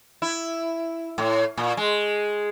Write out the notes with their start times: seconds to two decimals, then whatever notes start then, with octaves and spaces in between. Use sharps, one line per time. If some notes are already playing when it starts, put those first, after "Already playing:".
0.22 E4
1.18 A2
1.57 A#2
1.77 G#3